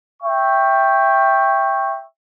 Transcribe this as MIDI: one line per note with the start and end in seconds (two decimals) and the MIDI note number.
0.23 2.01 76
0.23 2.01 79
0.23 2.01 85